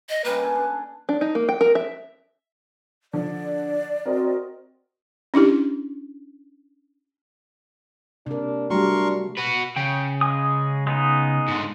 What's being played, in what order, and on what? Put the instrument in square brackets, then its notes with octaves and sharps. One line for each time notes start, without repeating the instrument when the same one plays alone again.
[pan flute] D#5
[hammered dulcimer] C#3 G3 A#3 [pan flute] B4
[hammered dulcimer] A4 G#5
D4
[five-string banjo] D4
D#4
A#3
G5
A#4
E5
[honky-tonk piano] D3 F3 [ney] D5
[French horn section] C4 F#4 [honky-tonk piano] A#4 D#5 A#5
[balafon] C#4 D4 E4 G4
[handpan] C3 A#4 [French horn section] A#3 D4
[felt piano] F#3 G3 [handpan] A3 [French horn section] D4 [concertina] A#4 C6 C#6
[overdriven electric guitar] F#4 B4
[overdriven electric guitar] C#3 [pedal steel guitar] G5
[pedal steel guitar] G#3 G#5 D#6
G#3 B3 D#4
[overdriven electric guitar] G#2 D3